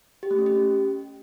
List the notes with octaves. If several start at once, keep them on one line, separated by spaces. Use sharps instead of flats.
G4
A3
C#4
G4